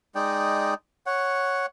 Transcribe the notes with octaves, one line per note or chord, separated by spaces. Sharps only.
G#3 D#4 D5 G5
C#5 F#5